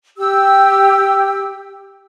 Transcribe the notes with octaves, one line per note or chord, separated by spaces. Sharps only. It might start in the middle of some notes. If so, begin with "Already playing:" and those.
G4 E6